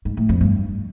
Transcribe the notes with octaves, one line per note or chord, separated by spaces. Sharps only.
G#2
A2
F2
G2